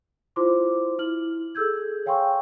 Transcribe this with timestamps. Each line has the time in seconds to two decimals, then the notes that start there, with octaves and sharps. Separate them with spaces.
0.36 E4 F4 C5 C6 D6
0.99 E4 F6 F#7
1.55 G#4 A4 E6 G6 G#6
2.06 C#5 F5 G5 G#5 C6 C#6